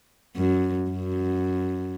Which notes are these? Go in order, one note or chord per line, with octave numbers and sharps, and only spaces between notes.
F#2
F#2